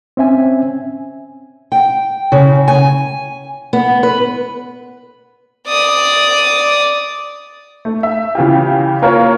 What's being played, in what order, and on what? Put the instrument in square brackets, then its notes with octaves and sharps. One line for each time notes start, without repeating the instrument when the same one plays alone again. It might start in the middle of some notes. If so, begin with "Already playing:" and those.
[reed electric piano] C4 C#4 E5 G#5
[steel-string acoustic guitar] G5
C#3
G#5
B3
B4
[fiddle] D5 D#6
[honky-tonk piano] A3
E5
C#3 E3 F4 G4
A#3 F4 A#4 C#5